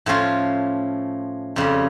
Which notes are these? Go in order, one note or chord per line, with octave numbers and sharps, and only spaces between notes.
A2 F3 C#4 F4
F2 C#3 G3